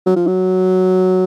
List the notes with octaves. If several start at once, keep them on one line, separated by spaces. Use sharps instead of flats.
F#3
F3
F#3